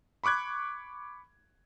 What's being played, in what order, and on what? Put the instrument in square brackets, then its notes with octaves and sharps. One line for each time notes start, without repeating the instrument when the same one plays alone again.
[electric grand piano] B5 C#6 D6 F#6 G#6